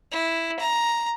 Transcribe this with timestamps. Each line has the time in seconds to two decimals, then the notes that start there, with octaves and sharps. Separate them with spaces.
0.12 E4
0.59 A#5